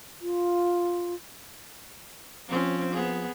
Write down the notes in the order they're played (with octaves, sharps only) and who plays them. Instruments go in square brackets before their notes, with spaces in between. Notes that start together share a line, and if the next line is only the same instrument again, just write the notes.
[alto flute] F4
[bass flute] F3 [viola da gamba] C4 C#4
[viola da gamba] B3 G#4